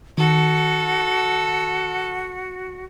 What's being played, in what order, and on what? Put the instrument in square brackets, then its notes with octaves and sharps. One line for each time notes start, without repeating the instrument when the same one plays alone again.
[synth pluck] D#3 [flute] F#4 [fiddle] A4